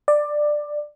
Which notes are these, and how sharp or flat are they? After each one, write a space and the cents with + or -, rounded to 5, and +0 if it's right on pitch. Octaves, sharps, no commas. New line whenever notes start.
D5 +10